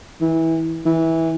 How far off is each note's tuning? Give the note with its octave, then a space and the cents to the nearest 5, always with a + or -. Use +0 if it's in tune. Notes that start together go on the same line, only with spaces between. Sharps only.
E3 -20
E3 -15